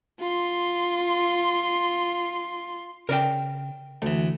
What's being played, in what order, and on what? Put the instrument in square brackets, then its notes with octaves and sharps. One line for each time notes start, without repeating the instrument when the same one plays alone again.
[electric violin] F4 C6
[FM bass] C#3 [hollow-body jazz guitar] A#4 D5 G5
[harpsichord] D2 E3 [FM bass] A3